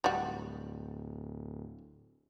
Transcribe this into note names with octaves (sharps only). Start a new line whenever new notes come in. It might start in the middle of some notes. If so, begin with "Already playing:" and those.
D1 G3 F#4